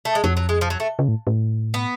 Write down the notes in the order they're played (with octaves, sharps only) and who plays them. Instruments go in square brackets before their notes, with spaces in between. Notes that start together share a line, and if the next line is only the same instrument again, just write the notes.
[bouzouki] A3
G#3
[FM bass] F2 [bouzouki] F#3
[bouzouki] F#3
G#3
F3
F#3
A3
[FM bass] C#3
A2
A2
[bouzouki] B3